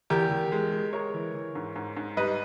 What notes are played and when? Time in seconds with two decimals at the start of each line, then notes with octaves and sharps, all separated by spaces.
0.10 E2 G4 A#4
0.31 E2
0.52 G#3
0.73 G#3
0.93 G#3 A#4 C#5
1.14 E3
1.34 E3
1.55 G#2
1.76 G#2
1.97 G#2
2.17 G3 B4 D#5